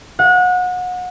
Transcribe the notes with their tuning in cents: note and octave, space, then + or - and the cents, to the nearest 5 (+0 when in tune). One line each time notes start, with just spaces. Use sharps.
F#5 -30